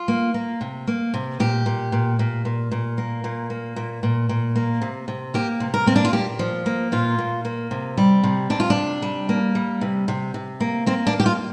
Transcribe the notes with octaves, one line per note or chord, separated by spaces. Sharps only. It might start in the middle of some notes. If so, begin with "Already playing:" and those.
Already playing: F4
A#3
A#3
C3
A#3
C3
A#2 G4
A#2
A#2
A#2
A#2
A#2
A#3
A#2
A#3
A#2
A#2
A#2
A#3
C3
C3
A#3 G4
C3
A#4
A#3 C4
D4
F4
A#2 G4
F3
A#3
A#2 F4
A#2
A#3
C3
G3
C3
C3 D4
F4
D4
C3
G3
A#3
G3
C3
C3
C3
A#3
A#3 C4
D4
A#3
G4
F4